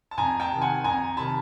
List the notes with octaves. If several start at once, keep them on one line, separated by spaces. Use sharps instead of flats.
A5
F2 G#5 A#5
G5 A5
C3 D#3
F#5 G#5
F2 G#5 A#5
C3 D#3 A5 B5